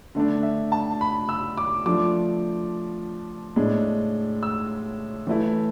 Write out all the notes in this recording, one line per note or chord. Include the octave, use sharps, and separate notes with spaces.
D3 A3 D4
E5
A5
B5
E6
D6
F3 A3 D4 D6
A2 G#3 D4
E6
E3 A3 E4